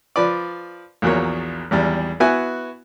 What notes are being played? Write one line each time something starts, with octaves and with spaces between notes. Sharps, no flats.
F3 B4 D5
A#1 E2 F#3 A#3 C#5
G#1 E2 G3
B3 E4 F#4 G#5